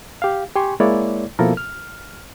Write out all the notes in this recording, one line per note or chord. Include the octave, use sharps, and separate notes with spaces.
G4 F5
G4 G5 G#5 C6 C#6
G#3 A#3 E4 C#5 D5
B2 F3 A#3 E4 A4 A#4
F6